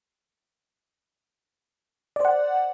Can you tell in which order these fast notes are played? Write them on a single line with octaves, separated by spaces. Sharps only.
D5 C5 F#5